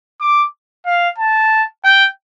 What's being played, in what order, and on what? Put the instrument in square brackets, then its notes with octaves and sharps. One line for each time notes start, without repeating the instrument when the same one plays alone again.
[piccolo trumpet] D6
F5
A5
G5